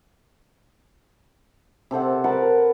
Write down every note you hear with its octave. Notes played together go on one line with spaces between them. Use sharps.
C3 A4 C5 F#5
A#4 B4 F#5 A5